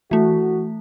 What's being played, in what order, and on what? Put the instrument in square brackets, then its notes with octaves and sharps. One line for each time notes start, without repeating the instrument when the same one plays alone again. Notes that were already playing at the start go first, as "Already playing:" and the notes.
[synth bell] E3 A3 [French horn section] F#4